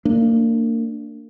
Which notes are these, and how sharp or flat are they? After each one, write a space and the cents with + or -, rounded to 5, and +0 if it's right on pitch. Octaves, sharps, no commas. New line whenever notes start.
A#3 -30 D4 +0